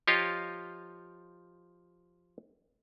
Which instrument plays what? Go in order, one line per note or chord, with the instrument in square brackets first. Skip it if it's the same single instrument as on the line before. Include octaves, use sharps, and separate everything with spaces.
[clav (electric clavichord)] F3 F4 G4 C#5 D#5 F5